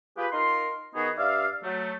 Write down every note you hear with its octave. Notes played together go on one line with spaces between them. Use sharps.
F4 G4 G#4 B4
D#4 F4 A#4 C6
D#3 B3 D#4 F#4 G#4
G2 D5 E5 F5
F#3 A3